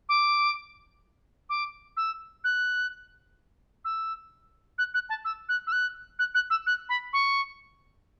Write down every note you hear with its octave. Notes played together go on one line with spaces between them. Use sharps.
D6
D6
E6
F#6
E6
F#6
F#6
A5
E6
F#6
E6
F#6
F#6
F#6
E6
F#6
B5
C#6